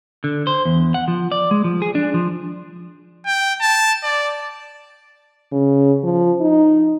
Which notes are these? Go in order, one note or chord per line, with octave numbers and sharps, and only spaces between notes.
D3
C5
E2
F#5
F3
D5
G#3
F3
G#4
D4
F3
G5
A5
D5
C#3
F3
D#4